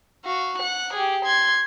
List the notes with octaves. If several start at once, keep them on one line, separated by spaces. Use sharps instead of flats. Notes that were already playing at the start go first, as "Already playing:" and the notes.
F#4 F5
F#5 F#6
G4 G#4
C6 G#6